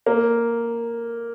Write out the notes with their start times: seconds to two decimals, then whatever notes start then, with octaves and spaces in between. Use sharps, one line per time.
0.06 A#3